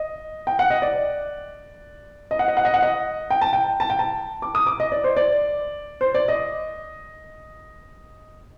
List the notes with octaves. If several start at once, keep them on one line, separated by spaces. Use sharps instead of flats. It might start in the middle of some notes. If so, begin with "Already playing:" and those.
Already playing: D#5
G5
F#5
D#5
D5
D#5
F#5
D#5
F#5
D#5
F#5
D#5
G5
A5
G5
A5
G5
A5
D6
D#6
D6
D#5
D5
C5
D5
C5
D5
D#5